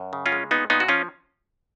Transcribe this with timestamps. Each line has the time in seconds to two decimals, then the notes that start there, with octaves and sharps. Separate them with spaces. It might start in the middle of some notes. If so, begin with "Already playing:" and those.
Already playing: F#2
0.13 C#3
0.26 C#4 F4
0.32 G#3
0.51 A#2 B3 D#4
0.70 A#2 B3 D#4
0.80 F#4
0.88 F3 C#4 F4